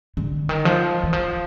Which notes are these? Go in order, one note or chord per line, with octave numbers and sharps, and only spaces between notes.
D3
D#3
F3
E3
F3